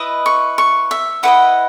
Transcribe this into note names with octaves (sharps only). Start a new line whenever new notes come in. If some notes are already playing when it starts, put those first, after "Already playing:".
Already playing: E4 B4 D#5 D#6
C#6
C#6
E5
E4 B4 D#5 F#5